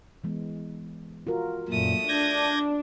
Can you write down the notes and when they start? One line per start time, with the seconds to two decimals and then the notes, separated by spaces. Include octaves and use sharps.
0.24 E3 G#3 B3
1.27 F4 F#4 A#4
1.69 F#2 A#2 A3 D#6
2.08 D4 G6 G#6 A#6